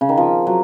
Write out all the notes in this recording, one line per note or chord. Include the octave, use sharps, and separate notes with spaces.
C#3
D#3
F3
F#3